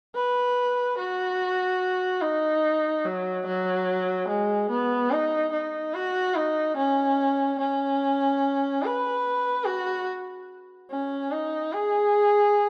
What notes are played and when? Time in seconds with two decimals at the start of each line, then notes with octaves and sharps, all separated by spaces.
0.15 B4
0.98 F#4
2.22 D#4
3.05 F#3
3.46 F#3
4.28 G#3
4.70 B3
5.11 D#4
5.52 D#4
5.94 F#4
6.35 D#4
6.77 C#4
7.59 C#4
8.83 B4
9.65 F#4
10.90 C#4
11.31 D#4
11.73 G#4